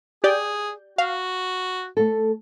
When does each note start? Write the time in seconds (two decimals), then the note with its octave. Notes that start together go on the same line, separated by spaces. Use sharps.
0.24 G4 G#4 D5 G6
0.98 F#4 F5
1.97 A3 A4